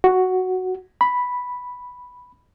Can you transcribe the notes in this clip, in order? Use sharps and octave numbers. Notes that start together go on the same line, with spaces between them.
F#4
B5